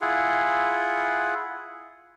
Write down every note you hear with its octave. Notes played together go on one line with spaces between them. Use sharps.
E4 F4 G#4 F#5